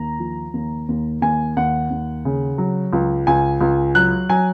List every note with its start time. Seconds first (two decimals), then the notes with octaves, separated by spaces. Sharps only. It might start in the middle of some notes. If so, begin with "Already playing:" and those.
Already playing: D#2 A#5
0.19 F3
0.54 D#2
0.89 D#2
1.22 D#2 G#5
1.57 D#2 F#5
1.90 D#2
2.25 C#3
2.58 F#3
2.93 C#2
3.27 C#2 G#5
3.61 C#2
3.95 F#3 F#6
4.29 F#3 G#5